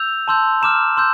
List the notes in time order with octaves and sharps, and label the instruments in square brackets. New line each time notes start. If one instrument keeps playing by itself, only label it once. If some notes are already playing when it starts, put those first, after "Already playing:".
Already playing: [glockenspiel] E6 G6 F7
A5 C6 E6 G6
A#5 D6 F6 E7
C6 E6 G6